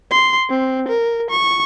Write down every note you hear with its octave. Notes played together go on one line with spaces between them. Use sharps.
C6
C4
A#4
C#6